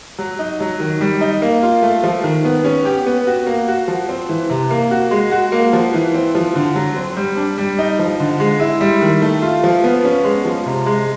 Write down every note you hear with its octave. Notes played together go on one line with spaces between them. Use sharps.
F#3
D#4
F#3
D#3
G3
D#4
A#3
F4
A3
F3
D#3
B3
C#4
G4
B3
F#4
A#3
F#4
F3
C4
E3
C3
A#3
F#4
G#3
F#4
A#3
F3
E3
C4
F3
D3
F#3
C4
G3
D4
G3
D#4
F3
D3
G#3
E4
G3
D#3
A3
F4
F3
B3
C#4
G#3
F3
C3
G#3